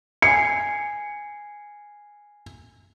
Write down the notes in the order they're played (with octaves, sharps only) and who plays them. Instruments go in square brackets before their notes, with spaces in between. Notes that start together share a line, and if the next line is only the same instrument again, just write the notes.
[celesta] G#5 G#6 C7 [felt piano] C#7